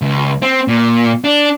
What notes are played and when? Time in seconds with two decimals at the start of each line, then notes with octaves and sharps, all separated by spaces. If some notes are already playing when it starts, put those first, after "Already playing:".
0.02 C#2
0.42 C4
0.68 A#2
1.24 D4